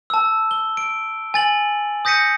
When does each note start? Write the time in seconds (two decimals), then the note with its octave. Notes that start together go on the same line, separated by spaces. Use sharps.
0.10 A5 E6
0.51 G7
0.77 D7
1.34 G#5 A6 F#7
2.05 D#6 G6 A#6 B6 C#7 D#7